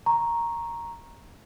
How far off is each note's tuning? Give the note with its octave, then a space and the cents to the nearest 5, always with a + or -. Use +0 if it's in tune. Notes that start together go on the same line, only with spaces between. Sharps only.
A#5 +0 C#6 -20